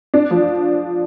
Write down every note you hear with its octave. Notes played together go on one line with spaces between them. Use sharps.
D4
F3